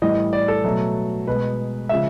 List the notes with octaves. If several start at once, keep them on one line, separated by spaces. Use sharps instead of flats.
A2 E3 G3 D#5
D5
A4
B2 F#3 A3
B2 G#3 B4
C#3 F3 G#3 E5